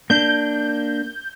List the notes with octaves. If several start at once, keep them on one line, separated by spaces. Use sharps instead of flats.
A#3 D4 G6